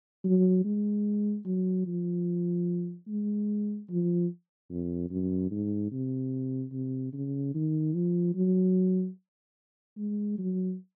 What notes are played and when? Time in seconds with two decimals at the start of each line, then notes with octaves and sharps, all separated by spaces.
0.24 F#3
0.65 G#3
1.45 F#3
1.86 F3
3.08 G#3
3.90 F3
4.70 F2
5.11 F#2
5.51 G#2
5.91 C3
6.72 C3
7.13 C#3
7.54 D#3
7.94 F3
8.35 F#3
9.97 G#3
10.38 F#3